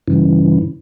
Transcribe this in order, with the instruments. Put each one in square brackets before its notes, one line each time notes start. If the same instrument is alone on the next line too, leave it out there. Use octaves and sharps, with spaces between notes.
[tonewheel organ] G2 C#3 E3